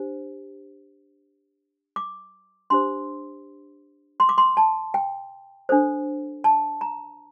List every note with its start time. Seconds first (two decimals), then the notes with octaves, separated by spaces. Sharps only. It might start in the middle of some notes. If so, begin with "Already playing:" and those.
Already playing: D4 G4 C5
1.96 D6
2.70 D4 G4 C5 C6
4.20 C6
4.29 D6
4.38 C6
4.57 A5
4.94 G5
5.69 D4 A4 C5
6.44 A5
6.81 A#5